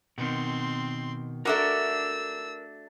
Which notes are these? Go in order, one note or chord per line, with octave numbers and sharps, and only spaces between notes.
B2 D#3 C4 C6
A3 D4 F#4 A#4 A#5 E6